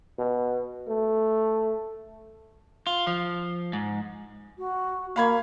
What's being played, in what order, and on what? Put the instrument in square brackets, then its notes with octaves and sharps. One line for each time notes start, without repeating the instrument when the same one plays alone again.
[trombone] B2
A3
[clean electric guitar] F4
F3
G#2
[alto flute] F#4
[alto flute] A#3 [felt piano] F5 B5 G#6